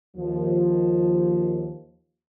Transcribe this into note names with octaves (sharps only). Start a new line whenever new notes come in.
D#2 F3